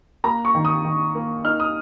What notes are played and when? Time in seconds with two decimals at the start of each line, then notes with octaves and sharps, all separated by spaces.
0.24 A#3 A#5
0.45 C#6
0.55 D#3
0.65 D#6
0.85 D#3
1.15 A#3
1.44 D#4 F6
1.60 D#6